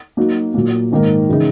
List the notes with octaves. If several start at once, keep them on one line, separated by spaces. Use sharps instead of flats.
F#3 A#3 D#4 F#4
A#2 F#3 A#3
G#2 D#3 A#3 D#4 A#4
C#3 E3 G#3 D#4